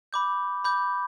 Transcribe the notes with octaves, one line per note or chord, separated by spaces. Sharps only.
B5 D6 G6
B5 D6 G6